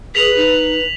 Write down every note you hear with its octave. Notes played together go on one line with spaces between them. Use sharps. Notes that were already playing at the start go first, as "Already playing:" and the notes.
G#4 B4 B6 F7 F#7
D#4